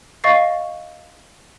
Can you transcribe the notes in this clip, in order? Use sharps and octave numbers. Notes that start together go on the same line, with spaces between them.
D#5 F5 C#6 A6 C7